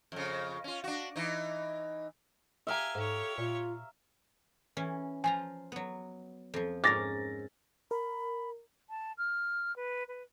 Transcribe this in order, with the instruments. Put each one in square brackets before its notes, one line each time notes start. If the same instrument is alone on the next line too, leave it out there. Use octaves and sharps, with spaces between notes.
[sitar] F2 C#3
C#4 F4
D4 F#4
E3 D#4
[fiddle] G4 G#5 [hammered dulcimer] E5 F5 A#5
[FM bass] G#2 [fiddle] G4 C#5 [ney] A4
[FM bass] A#2 [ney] F4
[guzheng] E3 C#4
[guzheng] F3 F4 A#5 [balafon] G#5
[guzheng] F#3 B3
F2 F3
[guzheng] G#2 C#4 A#4 [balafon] D6 [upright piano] A6 A#6
[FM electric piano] A#4 [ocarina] B5
[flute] A5
F6
B4
B4